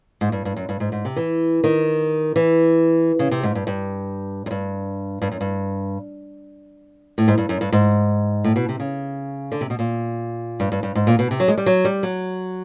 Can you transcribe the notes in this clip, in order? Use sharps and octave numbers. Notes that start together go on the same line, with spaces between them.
G#2
G2
G2
F#2
G2
G#2
G#2
C3
E3
D#3
E3
C#3
C3
G#2
G2
G2
F#2
G2
G2
F#2
G2
A2
G#2
G2
F#2
G2
G#2
A2
B2
C3
C#3
D3
C3
B2
A#2
G2
G2
G2
G#2
A#2
B2
C3
F#3
G#3
G3
F#3
G3
F#3